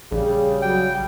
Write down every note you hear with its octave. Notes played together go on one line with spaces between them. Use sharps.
A#1 C#3 G3 G#4
F#3 G5